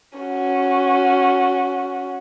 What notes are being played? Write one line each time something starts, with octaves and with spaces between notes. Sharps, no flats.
C#4 F#4